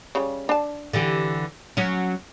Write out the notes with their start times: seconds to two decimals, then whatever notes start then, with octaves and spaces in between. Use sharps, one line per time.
0.15 C#3 F#3 G3
0.49 D4 A5
0.93 D3 E3 G4
1.77 F#3 C#4